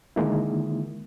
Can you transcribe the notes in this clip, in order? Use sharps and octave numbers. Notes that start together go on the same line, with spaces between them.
D3 D#3 G#3 A#3 E4